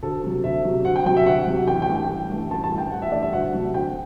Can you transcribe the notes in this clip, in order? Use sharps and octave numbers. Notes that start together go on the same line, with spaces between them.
D2 A4
C3 F#3
D2 E5
C3 F#3
D2 F#5
G5
C3 F#3 G5
E5
D2 F#5
C3 F#3
A1 G5
G5
G2 E3 A3
G5
A1
G2 E3 A3
A1 A5
A5
G2 E3 A3
G5
A1 F#5
E5
G2 E3 A3 D5
E5
D2 F#5
C3 F#3 A3
D2 G5